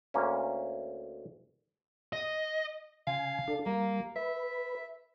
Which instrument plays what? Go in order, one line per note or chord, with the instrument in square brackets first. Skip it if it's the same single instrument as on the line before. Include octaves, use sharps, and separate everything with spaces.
[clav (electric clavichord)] D2 A#3 C#4
[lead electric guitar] D#5
[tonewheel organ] C#3 G#5 [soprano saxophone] F5
[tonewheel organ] D4 A4
[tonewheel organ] G3 [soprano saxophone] A#3
[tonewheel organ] B4 [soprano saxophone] E5